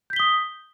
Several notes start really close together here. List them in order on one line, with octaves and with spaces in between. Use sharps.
G6 B6 G7 D#6